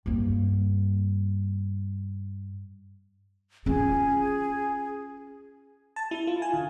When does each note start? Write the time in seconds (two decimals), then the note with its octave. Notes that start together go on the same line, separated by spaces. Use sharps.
0.06 G2 A#3
3.66 C#4 F4 G#4
5.96 A5
6.11 E4
6.27 F4
6.42 G#5
6.54 D3